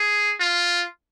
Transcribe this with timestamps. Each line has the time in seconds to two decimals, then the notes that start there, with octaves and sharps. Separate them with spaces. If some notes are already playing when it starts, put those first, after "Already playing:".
Already playing: G#4
0.40 F4